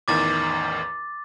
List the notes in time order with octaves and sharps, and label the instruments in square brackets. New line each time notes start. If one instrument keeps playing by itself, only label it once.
[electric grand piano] A1 E2 D#3 [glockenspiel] D6 A6